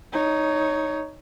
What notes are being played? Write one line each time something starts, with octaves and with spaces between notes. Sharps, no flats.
D#4 C#5